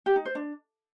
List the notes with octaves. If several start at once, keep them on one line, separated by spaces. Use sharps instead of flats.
G4
D#4
C5
D4